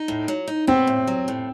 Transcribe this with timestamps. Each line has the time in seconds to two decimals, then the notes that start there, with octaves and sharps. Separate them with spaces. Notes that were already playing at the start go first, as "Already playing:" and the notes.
Already playing: D#4
0.08 A2
0.28 F#3
0.48 D#4
0.67 B3 C4
0.87 A2
1.07 F#3
1.28 A2